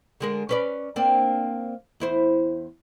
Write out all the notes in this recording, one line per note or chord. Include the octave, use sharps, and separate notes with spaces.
D3 G#3 A#4
C#4 B4 D5
A#3 C4 D4
E2 E4 C5